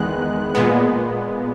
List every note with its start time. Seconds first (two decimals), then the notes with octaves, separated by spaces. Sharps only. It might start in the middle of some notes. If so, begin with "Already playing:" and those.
Already playing: E2 D#3 G#3 B3 F#6
0.55 A#2 G#3 B3